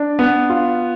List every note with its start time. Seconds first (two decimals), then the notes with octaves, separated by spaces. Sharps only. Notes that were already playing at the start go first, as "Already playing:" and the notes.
Already playing: D4
0.19 B3
0.50 F4